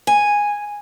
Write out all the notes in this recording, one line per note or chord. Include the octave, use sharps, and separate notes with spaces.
G#5